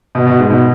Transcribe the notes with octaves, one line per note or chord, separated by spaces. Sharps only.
B2
B2
G#2
B2